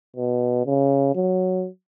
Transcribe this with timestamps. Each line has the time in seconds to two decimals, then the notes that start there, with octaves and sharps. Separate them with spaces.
0.16 B2
0.66 C#3
1.15 F#3